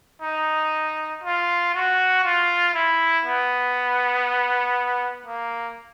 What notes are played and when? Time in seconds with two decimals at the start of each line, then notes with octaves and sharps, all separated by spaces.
0.22 D#4
1.24 F4
1.74 F#4
2.24 F4
2.74 E4
3.25 B3
5.26 A#3